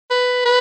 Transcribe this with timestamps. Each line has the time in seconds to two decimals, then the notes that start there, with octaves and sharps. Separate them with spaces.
0.11 B4
0.45 B4